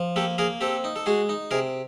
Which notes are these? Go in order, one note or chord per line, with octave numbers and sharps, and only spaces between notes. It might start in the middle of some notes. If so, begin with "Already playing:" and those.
Already playing: F3
A#3 G4 A4
A#3 G#4 A#4
C4 G4 A4
D#4
A4
G#3 F#4 G#4
D#4
C3 G#4 A#4